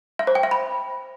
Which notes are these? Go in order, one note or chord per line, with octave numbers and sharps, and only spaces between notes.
E5
C5
G5
E5
B5